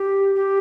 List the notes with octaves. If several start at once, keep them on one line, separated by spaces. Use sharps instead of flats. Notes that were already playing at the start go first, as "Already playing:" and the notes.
Already playing: G4
G4